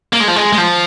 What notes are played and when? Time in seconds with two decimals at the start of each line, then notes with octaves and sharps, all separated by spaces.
0.13 A#3
0.21 G#3
0.28 F3
0.36 G#3
0.53 G#3
0.58 F3